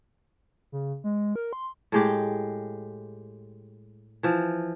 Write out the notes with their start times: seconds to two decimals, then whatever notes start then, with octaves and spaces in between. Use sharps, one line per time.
0.72 C#3
1.04 G#3
1.36 A#4
1.53 C6
1.92 A2 G#3 G4
4.23 E3 F3